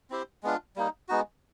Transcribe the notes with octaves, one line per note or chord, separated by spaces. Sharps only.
C4 E4 G4 C5
G#3 B3 D4 F4
G3 A#3 D#4
G#3 B3 D#4 F#4